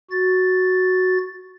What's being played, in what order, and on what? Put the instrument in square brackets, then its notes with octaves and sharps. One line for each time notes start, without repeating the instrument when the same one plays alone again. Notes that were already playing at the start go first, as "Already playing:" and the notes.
[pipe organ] F#4 A6